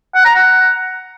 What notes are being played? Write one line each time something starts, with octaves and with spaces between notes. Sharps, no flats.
F#5
A#5
F#5